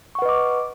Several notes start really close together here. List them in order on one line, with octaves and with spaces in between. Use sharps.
C#6 F#5 B4 D#5 D6